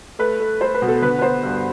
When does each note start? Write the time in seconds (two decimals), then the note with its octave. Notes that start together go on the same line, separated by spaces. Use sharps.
0.19 A3 B4
0.40 A3
0.61 A3 C5
0.74 B4
0.82 B2
0.88 A4
1.02 D3 B4
1.19 B4
1.22 B3 C5
1.43 G2